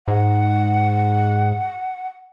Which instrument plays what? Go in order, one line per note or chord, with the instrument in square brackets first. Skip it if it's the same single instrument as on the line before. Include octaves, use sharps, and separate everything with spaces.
[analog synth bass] G#2 [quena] F#5